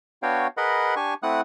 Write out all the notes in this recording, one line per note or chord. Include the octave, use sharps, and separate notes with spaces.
B3 D4 F#4 C#5 F5 G5
G#4 A#4 B4 D#5 F#5 B5
D4 G4 G#5 C#6
A3 C4 E4 F#5 D#6 F#6